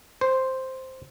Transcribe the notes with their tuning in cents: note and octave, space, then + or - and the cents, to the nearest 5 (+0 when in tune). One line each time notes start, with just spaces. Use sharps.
C5 +0